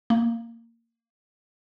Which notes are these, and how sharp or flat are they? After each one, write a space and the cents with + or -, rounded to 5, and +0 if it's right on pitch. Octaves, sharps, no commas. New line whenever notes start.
A#3 -15